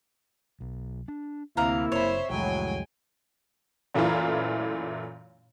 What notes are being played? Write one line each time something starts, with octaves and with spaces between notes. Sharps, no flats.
B1
D4
D2 C3 A#3 E4 F5 A#5
F#1 C5 C#5 E5 B5
C2 F2 A2 F#3 G#3 G5 G#5
F#2 A#2 E3 A3 E4 F4